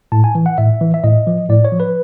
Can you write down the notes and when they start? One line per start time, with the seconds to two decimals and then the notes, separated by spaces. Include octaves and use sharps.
0.12 A2 A5
0.24 G#5
0.35 E3
0.46 F#5
0.58 A2 E5
0.81 E3
0.94 E5
1.04 A2 D#5
1.27 F3
1.49 A2 D5
1.65 C#5
1.72 F3
1.80 B4